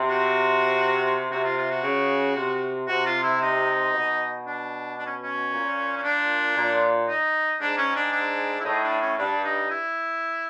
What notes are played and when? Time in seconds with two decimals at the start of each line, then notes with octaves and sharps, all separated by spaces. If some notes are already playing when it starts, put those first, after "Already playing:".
Already playing: C3
0.09 F#4
1.30 C3 F#4
1.44 F4
1.57 F4
1.70 F#4
1.83 C#3
2.36 C3
2.88 C3 F#4
3.06 F4
3.23 E4
3.41 D#4
3.94 B2
4.46 D4
4.99 D4
5.06 C#4
5.22 C#4
5.50 A#2
5.97 C#4
6.03 D4
6.55 A#2
7.08 D#4
7.60 G#2 D4
7.78 C#4
7.96 D4
8.12 D4
8.60 E4
8.65 A2 D#4
8.83 D4
9.01 C#4
9.18 G2 D4
9.44 D#4
9.70 E4